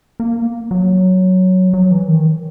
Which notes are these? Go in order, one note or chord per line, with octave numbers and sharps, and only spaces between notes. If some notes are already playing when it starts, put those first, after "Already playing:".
A#3
F#3
F#3
E3
D#3